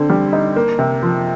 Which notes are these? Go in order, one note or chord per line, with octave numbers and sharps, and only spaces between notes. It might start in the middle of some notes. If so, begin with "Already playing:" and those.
Already playing: D3 C4
G3
D#4
A#3
C3
F3